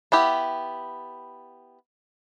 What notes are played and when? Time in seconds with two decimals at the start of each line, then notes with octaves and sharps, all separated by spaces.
0.12 B3 E4 G4